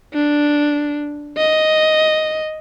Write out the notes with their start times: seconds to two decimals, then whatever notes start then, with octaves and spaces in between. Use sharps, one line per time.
0.14 D4
1.37 D#5